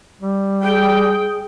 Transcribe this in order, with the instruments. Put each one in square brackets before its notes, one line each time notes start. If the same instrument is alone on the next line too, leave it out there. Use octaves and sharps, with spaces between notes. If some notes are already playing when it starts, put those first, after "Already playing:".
[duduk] G3
[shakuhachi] G#4 [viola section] G5